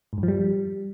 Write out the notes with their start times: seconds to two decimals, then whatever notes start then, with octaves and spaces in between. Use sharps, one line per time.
0.13 G#2
0.18 G2
0.23 F3
0.28 G3